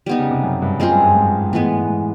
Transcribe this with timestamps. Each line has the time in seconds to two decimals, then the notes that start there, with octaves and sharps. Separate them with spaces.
0.06 G3 B3 D#4
0.19 C#3
0.31 C3
0.44 F#2
0.62 G2
0.80 F#2 G#3 C4 F4 G#4
0.91 G2
1.04 G2
1.15 G#2
1.52 A2 E3 G#3 B3
1.64 G#2
1.77 G#2
1.89 G#2